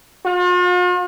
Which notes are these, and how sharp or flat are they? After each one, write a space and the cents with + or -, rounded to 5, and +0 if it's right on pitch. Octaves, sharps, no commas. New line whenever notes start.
F4 +45